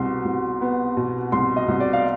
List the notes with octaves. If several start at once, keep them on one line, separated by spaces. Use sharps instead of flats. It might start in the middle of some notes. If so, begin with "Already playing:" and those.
Already playing: C2 B2 C6
C2
B3
B2
C2 C6
D#5
C2
D5
F5